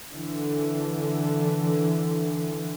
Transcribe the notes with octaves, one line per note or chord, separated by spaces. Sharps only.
D3 E3